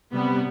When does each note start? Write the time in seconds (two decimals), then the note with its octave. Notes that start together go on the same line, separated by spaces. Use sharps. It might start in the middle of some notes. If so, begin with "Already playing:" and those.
0.13 C3 G3 B3